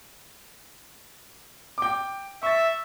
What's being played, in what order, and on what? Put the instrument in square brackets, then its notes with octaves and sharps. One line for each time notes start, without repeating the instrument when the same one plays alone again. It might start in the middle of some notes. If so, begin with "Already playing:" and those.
[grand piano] G5 D6
[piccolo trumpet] E5 [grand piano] C#6 A6